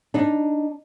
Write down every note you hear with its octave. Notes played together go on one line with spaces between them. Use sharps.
D4 D#4